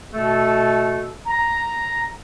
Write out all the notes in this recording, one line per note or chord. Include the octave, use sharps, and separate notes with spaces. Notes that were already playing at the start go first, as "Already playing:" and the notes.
B2 A3 A4
A#5